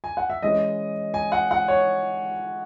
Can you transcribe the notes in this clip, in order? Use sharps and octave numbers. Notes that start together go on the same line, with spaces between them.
G#5
F#5
E5
E3 G#3 C#4 D#5
G#5
F#5
F#5
C#5